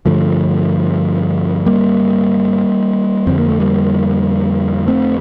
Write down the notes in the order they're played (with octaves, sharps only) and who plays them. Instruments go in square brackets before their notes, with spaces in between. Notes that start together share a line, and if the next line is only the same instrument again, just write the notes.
[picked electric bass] G2 D3 F3 A3
G3 A#3
F2 D3 C4
A#3
A3
G3 A#3
A3 C4